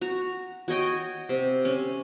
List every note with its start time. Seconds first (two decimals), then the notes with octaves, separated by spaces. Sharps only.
0.01 F#4 A#5
0.68 F#4 C#5 D#5 G5
1.29 C3
1.65 C#4